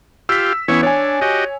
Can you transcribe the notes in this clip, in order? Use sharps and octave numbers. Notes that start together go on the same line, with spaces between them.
F4 G4 E6 B6
E3 B3 C#4 E4 C#5
D4 C#5 G#5
F#4 G4 D#5